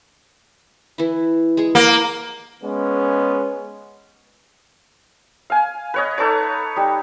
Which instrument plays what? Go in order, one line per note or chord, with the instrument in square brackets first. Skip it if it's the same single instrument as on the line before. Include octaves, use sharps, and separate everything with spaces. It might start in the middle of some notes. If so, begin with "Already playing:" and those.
[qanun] E3 E4
G#3 G#4
[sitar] A#3
[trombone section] G#3 B3 C#4
[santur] F5 G#5
B4 C#5 D#5
D#4 A4 B4 C#5
G3 D#4